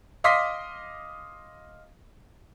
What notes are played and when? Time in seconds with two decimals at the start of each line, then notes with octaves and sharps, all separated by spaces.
0.24 D#5 F5 C6 D6 D#6 B6